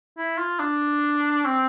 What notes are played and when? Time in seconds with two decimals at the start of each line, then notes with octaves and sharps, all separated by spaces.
0.18 E4
0.38 F4
0.60 D4
1.45 C4